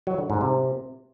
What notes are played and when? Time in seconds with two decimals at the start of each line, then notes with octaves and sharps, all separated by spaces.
0.07 F#3
0.18 D3
0.30 G#2
0.41 C3